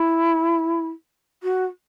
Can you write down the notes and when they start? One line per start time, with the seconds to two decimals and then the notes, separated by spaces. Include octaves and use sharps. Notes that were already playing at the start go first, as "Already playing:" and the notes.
Already playing: E4
1.43 F#4